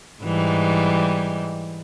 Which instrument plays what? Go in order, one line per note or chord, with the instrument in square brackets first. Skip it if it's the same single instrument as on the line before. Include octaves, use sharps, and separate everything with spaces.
[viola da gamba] G#2 E3 G3